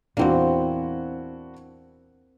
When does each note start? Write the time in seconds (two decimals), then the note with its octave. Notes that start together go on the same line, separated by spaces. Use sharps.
0.17 E2 A#2 A#3 C4 D4 E4 F#4